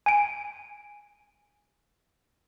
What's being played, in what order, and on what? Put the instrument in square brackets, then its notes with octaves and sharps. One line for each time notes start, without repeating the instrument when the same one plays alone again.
[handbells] G#5 D7